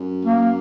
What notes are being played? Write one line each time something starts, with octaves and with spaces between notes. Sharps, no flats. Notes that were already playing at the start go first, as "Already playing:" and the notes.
Already playing: F#2
A#3